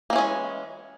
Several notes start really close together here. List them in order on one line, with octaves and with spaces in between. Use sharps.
A#3 E3 C#4 G#3